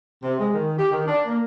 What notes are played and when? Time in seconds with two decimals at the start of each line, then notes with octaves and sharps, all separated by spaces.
0.23 C3
0.40 G#3
0.54 D#3
0.79 G4
0.91 D#3
1.08 D4
1.27 A#3